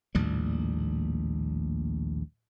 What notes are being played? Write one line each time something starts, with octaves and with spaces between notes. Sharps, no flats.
A#1 D#2 A2 G3